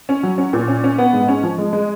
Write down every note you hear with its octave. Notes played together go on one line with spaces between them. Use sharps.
C#4
F#3
C#4
A#2
C#4
C#4
B3
G#2
C#4
F3
G#3
G#3